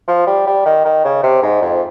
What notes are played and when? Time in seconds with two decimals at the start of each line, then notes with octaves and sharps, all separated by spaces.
0.08 F3
0.27 G3
0.47 G3
0.66 D#3
0.85 D#3
1.05 C#3
1.23 C3
1.43 G#2
1.62 F2